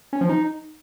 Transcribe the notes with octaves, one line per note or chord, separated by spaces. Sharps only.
C#4
F3
D#4